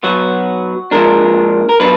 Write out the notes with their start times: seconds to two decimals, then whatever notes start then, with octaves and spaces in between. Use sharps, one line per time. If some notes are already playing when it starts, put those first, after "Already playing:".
0.03 B2 F#3 B3 F#4
0.91 A#2 F3 G#3 D4 A#4
1.69 A#4
1.80 B2 F#3 D4 B4